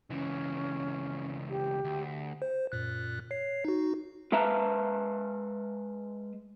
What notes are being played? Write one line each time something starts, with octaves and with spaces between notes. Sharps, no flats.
C#2 E3 C#4
G4
D2
C5
F#2 A#2 F#6
C#5 C7
D#4 F#4
G#3 B4 E5 F5 A5 A#5